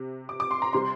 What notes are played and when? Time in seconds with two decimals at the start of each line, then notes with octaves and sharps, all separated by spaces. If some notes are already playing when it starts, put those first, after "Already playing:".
Already playing: C3
0.29 D6
0.40 D6
0.51 C6
0.62 A#5
0.73 C3 G3 C6